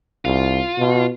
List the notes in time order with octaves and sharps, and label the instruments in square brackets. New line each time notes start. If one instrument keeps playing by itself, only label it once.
[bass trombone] C2 [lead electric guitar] F4
[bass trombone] B2